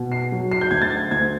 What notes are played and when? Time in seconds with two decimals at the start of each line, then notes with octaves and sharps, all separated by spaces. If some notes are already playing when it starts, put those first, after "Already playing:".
Already playing: B2
0.12 C7
0.32 F#3
0.52 C7
0.61 G6
0.71 D2 G#6
0.82 A6
0.90 G#6
1.11 D2 G#6